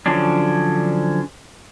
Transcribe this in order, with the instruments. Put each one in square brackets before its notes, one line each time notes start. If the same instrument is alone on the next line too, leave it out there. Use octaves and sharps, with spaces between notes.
[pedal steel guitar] D3 F3 F#3 C#4 D4